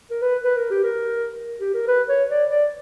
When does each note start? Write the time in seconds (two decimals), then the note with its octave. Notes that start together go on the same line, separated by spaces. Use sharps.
0.10 A#4
0.22 B4
0.43 B4
0.56 A#4
0.70 G4
0.84 A#4
1.60 G4
1.74 A#4
1.88 B4
2.09 C#5
2.29 D5
2.49 D5